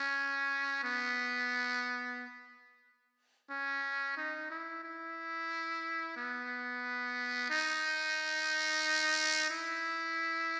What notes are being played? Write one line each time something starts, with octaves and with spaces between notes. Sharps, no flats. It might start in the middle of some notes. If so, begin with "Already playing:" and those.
Already playing: C#4
B3
C#4
D#4
E4
E4
B3
D#4
E4